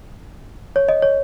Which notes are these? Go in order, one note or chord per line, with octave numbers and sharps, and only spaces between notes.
C#5
D#5
C#5